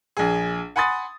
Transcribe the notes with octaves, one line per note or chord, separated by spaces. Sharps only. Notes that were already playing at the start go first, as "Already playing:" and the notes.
A#1 G#4
F#5 G#5 B5 C6 D#6 A6